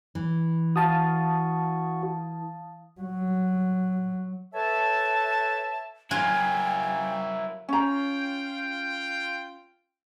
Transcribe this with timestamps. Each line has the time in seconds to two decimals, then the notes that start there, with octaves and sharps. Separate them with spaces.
0.15 E3
0.76 F#4 F5 A5 D#6
3.01 F#3
4.54 A4 B4 C#5 E5 A5
6.11 F#3 A#3 E4 F4 G5 G#5
7.69 C#4 F4 G5 A#5